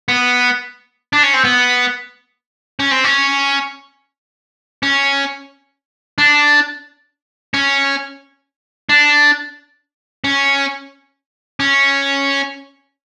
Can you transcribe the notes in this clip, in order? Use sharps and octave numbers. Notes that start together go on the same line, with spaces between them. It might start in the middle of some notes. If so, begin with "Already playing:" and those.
B3
D4
C#4
C4
B3
C#4
C4
C#4
C#4
D4
C#4
D4
C#4
C#4